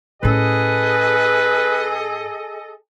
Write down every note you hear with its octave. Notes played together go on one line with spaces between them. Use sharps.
A2 C#4 G#4 A4 B4 D#5